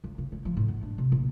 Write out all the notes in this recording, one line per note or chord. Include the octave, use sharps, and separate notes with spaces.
C#2
C#3
G#3
F3
A2
B3
D4
C3
A#1